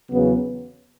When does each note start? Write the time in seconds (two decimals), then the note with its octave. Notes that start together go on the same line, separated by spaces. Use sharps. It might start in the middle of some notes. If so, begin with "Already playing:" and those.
0.11 E2 C#3 F#3 B3